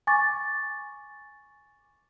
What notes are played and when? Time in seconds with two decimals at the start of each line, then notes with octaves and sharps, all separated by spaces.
0.07 G#5 C#6 D6 A6